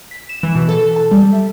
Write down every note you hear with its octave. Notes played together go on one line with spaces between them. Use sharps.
B6
E7
E3
B2
A4
A5
G3
E5